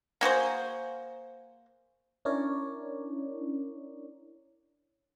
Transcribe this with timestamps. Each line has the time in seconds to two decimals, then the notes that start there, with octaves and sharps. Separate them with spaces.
0.21 A#3 F#4 G#4 C5
2.25 C#4 D4 E4 A#4 C#5 D5